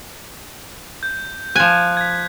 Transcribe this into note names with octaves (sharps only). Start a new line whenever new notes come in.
G6
F3 G#5 F#6
G#6 B6